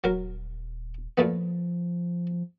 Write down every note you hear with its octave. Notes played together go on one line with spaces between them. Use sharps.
D#1 F#3 A#4
A#2 F3 A3 B3